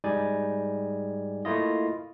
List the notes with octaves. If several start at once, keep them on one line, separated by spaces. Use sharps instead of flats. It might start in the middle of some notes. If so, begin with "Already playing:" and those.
G#2 G3 D#4 G#4 D5 G#5
A3 A#3 E4 F4 D#5